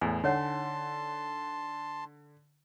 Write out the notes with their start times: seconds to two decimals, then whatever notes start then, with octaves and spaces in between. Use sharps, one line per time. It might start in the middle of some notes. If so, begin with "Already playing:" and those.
0.01 E2 A2 G#5
0.24 D3 D#4 C#5 F#5 A5 C6